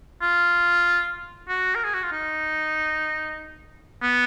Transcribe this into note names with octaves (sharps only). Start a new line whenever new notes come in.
F4
F#4
A#4
G#4
F#4
F4
D#4
B3